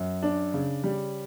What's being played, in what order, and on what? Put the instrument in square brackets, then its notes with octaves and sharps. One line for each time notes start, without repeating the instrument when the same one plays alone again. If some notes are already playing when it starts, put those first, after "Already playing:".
Already playing: [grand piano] F#2
D4
C#3
G3